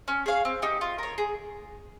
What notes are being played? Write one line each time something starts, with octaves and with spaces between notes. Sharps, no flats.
C#4
G#4 C#5 F5
C4
D#4 G4
F4
A#4 C#5
G#4